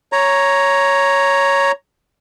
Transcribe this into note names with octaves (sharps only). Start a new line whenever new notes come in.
C#5 A#5